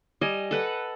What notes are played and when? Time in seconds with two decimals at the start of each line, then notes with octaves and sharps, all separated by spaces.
0.21 G3 D#5 G#5
0.51 A4 B4 F#5